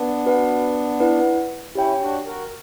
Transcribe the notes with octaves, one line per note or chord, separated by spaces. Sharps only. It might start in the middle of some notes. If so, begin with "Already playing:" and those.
Already playing: B3 D4
F#4 B4 F#5
E4 B4 D5 F#5
C#4 E4 G4 C#5 G5
D4 F#4
F#4 A#4